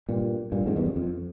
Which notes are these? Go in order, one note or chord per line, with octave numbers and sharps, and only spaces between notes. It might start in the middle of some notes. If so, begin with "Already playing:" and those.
G2 A#2
G2 A#2
F2 G#2
E2 G2
F2
F2